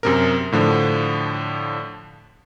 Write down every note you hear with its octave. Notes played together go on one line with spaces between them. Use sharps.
F#2 C3 A#4
A2 D3 F3